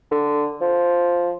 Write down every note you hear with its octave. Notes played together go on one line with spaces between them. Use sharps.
D3
F3